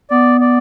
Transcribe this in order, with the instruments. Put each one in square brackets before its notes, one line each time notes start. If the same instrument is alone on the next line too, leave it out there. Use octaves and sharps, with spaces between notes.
[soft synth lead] B3 [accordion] D5
[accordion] D5